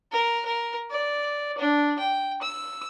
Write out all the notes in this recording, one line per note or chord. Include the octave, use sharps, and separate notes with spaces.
A#4
A#4
D5
D4
G5
E6